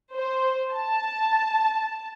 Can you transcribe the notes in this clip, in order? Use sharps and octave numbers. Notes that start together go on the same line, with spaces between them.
C5
A5